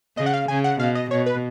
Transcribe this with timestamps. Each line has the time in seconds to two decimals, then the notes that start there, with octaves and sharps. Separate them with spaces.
0.17 C#3 D#5
0.26 F#5
0.34 F5
0.48 C#3 G#5
0.64 F#5
0.80 B2 F5
0.95 D#5
1.11 B2 C#5
1.26 B4